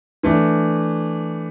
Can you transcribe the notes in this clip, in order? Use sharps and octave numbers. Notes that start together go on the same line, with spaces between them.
E3 A3 D4